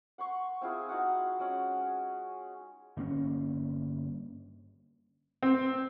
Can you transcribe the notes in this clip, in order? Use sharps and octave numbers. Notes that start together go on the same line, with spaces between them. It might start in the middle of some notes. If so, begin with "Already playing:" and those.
F#5 C6 C#6
C4 E4 F4 G#4
D#4 F#4 F#5
G#3 C#4 F#5
G1 A#3 C#4
C4